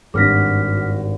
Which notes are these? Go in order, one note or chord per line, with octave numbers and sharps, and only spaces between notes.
G#1 G2 F#4 D6 F6 A#6 B6